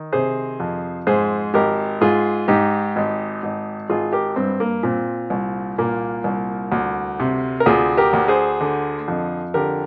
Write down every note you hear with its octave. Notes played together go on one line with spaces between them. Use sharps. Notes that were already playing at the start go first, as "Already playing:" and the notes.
Already playing: D#3
C3 G#4 C5
F2
G#2 G#4 C5
G#1 G4 A#4
G#2 F4 G#4
G#2 D#4 G4
G#1
G#1
G#1 F4 G#4
G4 A#4
G2 C4
A#3
A#2 C4
C2
A#2 A#3
C2
D2
C3
A#4
D2 F4 G#4
G4 A#4
D2
G#4 C5
D3
F2
D3 G4 A#4